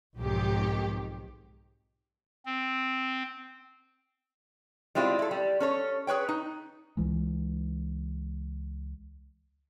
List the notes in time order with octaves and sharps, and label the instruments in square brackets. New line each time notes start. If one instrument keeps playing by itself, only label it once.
[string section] B1 F2 G#2 D#3 G4
[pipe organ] C4
[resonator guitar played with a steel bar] G3 G#3 C4 E4 F4
E4 A4
G3
C#4 A4 C#5
G#4 B4 C#5 G5
D#4
[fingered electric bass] C#2 E3 G#3